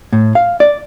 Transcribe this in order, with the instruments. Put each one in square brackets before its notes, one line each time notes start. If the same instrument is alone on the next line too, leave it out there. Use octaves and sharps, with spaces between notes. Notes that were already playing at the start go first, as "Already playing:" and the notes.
[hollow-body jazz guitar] A2
F5
D5